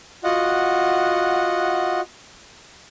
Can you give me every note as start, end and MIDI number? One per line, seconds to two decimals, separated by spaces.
0.24 2.01 65
0.24 2.01 66
0.24 2.01 75
0.24 2.01 78